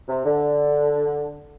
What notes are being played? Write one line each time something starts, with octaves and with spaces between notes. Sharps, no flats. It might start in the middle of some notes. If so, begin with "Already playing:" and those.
C3
D3